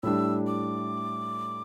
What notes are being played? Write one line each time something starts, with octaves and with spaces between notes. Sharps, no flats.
A2 G3 D4 E6
D6